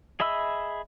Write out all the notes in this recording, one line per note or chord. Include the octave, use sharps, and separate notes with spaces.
G#4 D#5 E5 B5 E6